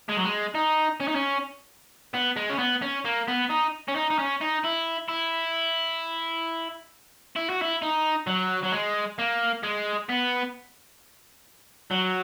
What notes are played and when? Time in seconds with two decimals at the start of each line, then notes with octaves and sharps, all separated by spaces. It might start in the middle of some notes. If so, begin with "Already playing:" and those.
0.09 G#3
0.17 F#3
0.24 G#3
0.55 D#4
1.00 C#4
1.08 D#4
1.15 C#4
2.14 B3
2.36 G#3
2.50 C#4
2.59 B3
2.82 C#4
3.05 A#3
3.28 B3
3.50 D#4
3.88 C#4
3.96 D#4
4.10 D#4
4.19 C#4
4.41 D#4
4.64 E4
5.08 E4
7.36 E4
7.49 F#4
7.62 E4
7.82 D#4
8.27 F#3
8.64 F#3
8.72 G#3
9.19 A#3
9.63 G#3
10.09 B3
11.91 F#3